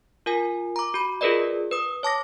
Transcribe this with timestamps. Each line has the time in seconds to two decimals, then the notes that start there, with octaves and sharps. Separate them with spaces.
0.26 F4 A#4 G#5
0.76 A#5 D6
0.94 F#4 B5
1.21 F4 G#4 A#4 B4 D5 D#5
1.71 B4 D#6
2.03 C#5 A5 D6 A#6